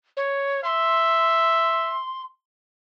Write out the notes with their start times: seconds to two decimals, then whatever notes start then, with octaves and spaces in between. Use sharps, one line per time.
0.17 C#5
0.64 E5 C6